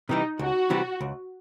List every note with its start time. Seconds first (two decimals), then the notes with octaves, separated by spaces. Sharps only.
0.09 C3 E3 G3 D#4
0.39 C#2 F#4
0.70 C3 E3 G3
1.01 C#2